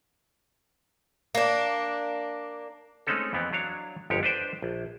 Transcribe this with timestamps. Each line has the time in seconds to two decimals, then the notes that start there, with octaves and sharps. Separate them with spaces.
1.35 A#3 D4
3.07 G#3 A3 C4 C#4 D#4 A4
3.33 F2 E3 B3 C4
3.53 F#3 D4 C#5 F5
4.10 G1 F2 G#3 G4 C#5
4.23 D4 B4 C5 G5
4.62 A#1